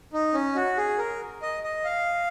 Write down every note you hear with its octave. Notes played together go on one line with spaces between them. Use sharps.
D#4
C#4
F#4
G#4
A#4
D#5
D#5
F5